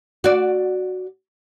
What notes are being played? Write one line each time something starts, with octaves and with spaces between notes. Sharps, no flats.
F#4 D5